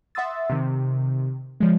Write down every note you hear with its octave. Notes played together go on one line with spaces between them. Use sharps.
E5 F#5 C6 D#6 E6 A6
C3 D#3
F3 G#3